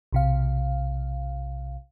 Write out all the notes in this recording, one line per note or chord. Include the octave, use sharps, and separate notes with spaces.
B1 C3 F5